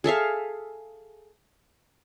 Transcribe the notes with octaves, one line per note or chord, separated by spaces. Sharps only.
G#4 A4 E5 F5